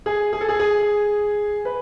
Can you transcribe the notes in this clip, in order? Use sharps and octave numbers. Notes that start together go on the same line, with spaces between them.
G#4
G#4
A4
G#4
G#4
B4